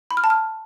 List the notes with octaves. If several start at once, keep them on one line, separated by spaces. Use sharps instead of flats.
B5
F6
A5
F6